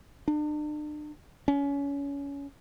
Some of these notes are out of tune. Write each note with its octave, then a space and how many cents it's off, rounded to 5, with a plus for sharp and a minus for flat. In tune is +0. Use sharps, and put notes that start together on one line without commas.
D4 +40
C#4 +25